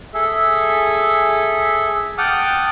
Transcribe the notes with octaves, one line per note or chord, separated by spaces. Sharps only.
G#4 A4 E5
F#5 G5 A5 D6 D#6 F6